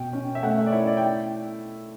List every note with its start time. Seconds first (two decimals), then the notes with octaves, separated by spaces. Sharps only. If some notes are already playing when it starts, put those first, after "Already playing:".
Already playing: B2 G5
0.13 C#4
0.35 E5
0.43 A3 F#5
0.57 E5
0.66 D5
0.72 E4 C#5
0.87 D5
0.97 G5